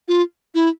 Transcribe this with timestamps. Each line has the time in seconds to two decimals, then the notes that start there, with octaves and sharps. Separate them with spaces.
0.08 F4
0.54 E4